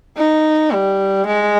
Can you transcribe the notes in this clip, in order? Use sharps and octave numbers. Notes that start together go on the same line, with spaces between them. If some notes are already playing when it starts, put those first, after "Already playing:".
D#4
G3
G#3